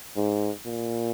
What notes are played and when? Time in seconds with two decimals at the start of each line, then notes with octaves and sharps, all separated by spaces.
0.16 G#2
0.66 A#2